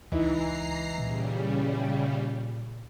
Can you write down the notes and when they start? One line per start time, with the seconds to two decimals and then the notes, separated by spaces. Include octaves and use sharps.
0.12 C#2 E3 D#4 E4 A#5 C7
0.98 A#2 C#3 G3